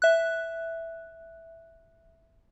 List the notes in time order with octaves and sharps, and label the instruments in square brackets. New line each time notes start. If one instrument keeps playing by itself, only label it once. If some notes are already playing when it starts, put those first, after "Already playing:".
[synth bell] E5 F#6